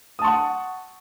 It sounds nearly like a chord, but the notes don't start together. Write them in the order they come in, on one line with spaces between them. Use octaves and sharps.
D#6 A5 C#6 F#5